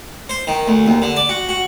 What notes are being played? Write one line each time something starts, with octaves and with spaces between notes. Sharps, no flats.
C5
D#3
D2
D#2
D3
D5
F#4
F#4